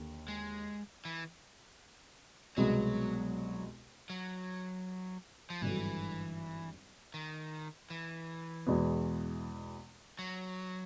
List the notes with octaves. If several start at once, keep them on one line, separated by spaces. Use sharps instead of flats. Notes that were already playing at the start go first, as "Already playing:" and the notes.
Already playing: D#2 D3
G#3
E3
C2 B2 F#3 G#3 B3
F#3
F3
G#1 G2 D3 E3 F#3
D#3
E3
E2 B2 G#3 B3
F#3